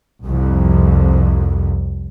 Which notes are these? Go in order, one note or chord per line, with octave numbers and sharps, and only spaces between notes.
C2 F2